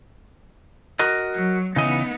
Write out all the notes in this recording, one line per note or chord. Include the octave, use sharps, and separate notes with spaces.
F#4 A#4 D#5
F#3
C#3 E3 B3 D#4 D#5